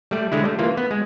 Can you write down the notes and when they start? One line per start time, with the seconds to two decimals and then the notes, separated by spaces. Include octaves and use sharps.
0.11 G3 A3 D5
0.32 D3 G#3 E4
0.44 G3 A3
0.59 E3 A#3 F4
0.77 B3
0.91 G#3